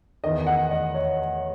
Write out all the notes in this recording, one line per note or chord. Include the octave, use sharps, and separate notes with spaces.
E2 D#3 D#5
F#5
D#5
C#5